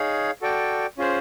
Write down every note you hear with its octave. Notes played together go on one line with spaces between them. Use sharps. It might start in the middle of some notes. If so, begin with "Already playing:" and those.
Already playing: D#4 G#4 C#5 F5
F#4 A4 D5 G5
C#4 F4 G#4 C5